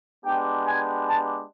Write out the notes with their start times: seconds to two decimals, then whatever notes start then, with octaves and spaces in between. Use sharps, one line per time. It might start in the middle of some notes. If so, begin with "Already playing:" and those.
0.24 G#3 B3 D4 G4 G5
0.67 G#5
1.09 A5